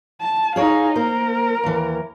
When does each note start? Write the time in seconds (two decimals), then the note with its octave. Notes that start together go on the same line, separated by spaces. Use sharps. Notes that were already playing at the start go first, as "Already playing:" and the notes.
0.20 A5
0.56 D#4 G#4 C#5 F5
0.96 A#3 A#4 C5
1.64 D#2 E3